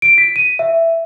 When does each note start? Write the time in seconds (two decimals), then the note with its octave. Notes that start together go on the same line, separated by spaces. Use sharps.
0.02 D7
0.18 B6
0.36 D#7
0.59 E5